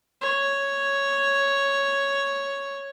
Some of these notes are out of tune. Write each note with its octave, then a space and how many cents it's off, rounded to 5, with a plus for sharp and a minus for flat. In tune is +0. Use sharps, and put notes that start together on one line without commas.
C#5 +0